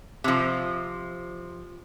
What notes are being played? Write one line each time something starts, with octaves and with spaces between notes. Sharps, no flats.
C3 F3